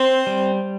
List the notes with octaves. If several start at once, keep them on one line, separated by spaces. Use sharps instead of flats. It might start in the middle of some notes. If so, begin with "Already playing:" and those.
Already playing: C4 C5
G3